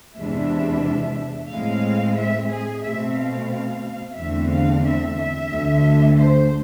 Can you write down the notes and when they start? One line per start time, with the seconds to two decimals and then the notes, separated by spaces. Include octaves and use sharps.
0.16 E2 C3 G#3 D4 E5
1.50 A2 G#3 C4 F5
2.17 E5
2.50 G#4
2.84 B2 A3 C4 E5
3.17 F5
4.17 E2 D3 A3 C4 E5
4.51 F5
4.84 E5
5.18 E5
5.51 D2 D3 A3
6.18 C5